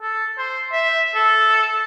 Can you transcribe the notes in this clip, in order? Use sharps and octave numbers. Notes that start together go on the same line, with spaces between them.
A4
C5
E5
A4